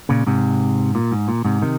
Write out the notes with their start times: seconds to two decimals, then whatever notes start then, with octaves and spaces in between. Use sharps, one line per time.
0.09 A#2 C#3
0.27 G#2 C3
0.95 A#2
1.12 G#2
1.28 A#2
1.45 G#2 C3
1.62 C3 D#3